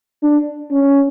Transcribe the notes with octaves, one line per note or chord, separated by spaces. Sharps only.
D4
C#4